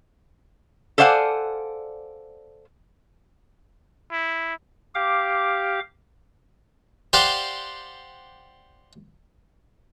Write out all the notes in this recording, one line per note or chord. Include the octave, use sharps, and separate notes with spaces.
A4 C5 D5 F5 F#5 G#5
E4
G4 F5 D6
G4 C5 D5 F5 F#5